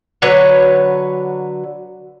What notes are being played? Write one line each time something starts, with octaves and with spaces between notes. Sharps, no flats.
D3 F#3 B4 C#5